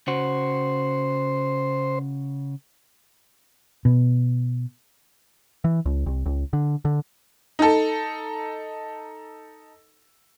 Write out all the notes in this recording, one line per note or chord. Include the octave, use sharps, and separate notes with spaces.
C#3 F#4 C5
B2
E3
C#2
C2
C#2
D3
D3
D#4 A4